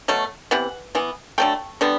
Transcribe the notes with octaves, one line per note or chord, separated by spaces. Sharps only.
B2 F#3 A3
C3 E3 B3 F#5
E3 B3
D3 F#3 A3 G5
D3 G3 B3